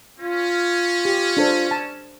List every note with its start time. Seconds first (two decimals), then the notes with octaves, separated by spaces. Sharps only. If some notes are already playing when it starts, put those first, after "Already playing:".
0.20 C#4 F4
1.05 G4
1.37 D4 A4 C5
1.71 A5